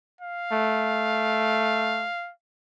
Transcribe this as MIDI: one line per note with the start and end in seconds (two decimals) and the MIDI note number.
0.21 2.32 77
0.52 2.08 57